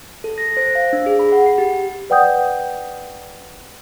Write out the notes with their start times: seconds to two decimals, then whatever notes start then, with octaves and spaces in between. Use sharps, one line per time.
0.24 A4
0.38 A#6
0.57 C5
0.75 F5
0.93 D4
1.06 G#4
1.19 B5
1.32 F#5
1.46 C7
1.58 G4
2.10 B4 D5 F#5 G5 D#6 G6